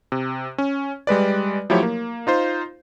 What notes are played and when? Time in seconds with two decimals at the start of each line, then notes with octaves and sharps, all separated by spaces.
0.12 C3
0.58 C#4
1.07 G3 G#3 B4 D5
1.70 F3 F#3 A3 E4 G4 C#5
1.83 A#3
2.27 D#4 F4 C5